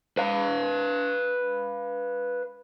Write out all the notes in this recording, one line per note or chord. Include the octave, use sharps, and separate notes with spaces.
B4 F5